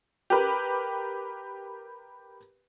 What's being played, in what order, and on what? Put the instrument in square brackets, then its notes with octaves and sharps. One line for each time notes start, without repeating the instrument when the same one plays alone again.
[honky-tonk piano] G4 A#4 B4